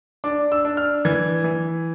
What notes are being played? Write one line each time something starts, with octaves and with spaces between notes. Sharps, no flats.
D4 D6
E6
D4
F6
E3 G#6
E3